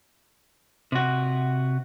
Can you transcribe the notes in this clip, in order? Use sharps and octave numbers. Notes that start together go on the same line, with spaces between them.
C3 F#4